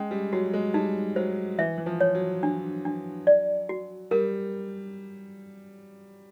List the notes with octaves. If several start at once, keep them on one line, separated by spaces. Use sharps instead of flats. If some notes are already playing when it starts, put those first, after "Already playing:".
Already playing: G#3 C#4
G3
F#3 F#4
G#3
G3 D#4
F#3 C5
E3 E5
E3
F3
C#5
F#3
D4
D4
D5
F#4
G3 A#4